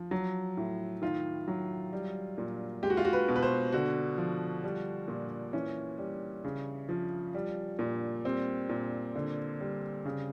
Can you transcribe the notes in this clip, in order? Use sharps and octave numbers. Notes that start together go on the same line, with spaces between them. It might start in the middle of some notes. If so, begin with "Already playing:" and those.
Already playing: F3
F#3
A2
D#3 F4
F#3
G3
A#2
G#3 G4
F#4
F4
F#4
B4
B2
B4
C5
D3 F#4
F3
G3
A#2
E3 C#4
G3
C#3
F3
G3
A#2
G3 C4
A#2
D3
G3
C#3